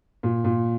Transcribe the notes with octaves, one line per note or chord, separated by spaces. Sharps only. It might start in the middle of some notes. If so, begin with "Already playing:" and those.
A#2
A#2